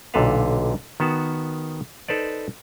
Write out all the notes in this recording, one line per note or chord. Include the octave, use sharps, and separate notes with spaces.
B1 A#2 D3 A4 B4 F5
D#3 B3 F#4 A5
D#4 A4 B4 C5 D5